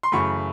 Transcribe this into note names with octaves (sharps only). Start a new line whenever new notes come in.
C6
F#2 C#3 E3 A3 B5 C#6